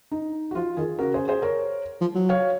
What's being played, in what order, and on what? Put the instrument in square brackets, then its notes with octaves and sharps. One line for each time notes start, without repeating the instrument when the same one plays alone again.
[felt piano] D#4
F#4
[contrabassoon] F3 [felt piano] F4
[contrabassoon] D#3 [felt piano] F4 G#4
[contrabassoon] C#3 [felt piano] F#4 A#4
[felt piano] G#4 C5
G#4 C5
A#4 C#5
[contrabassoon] F3
F#3
[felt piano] C#5 F5